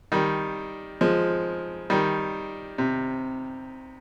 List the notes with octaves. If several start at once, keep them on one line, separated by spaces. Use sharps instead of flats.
D#3 G3
F3 G#3
D#3 G3
C3